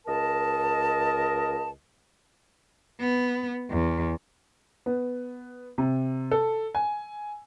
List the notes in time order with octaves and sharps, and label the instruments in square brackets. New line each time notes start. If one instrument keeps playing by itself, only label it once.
[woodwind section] C#2 A#4 D#5 A5
[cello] B3
E2
[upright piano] B3
C3
A4
G#5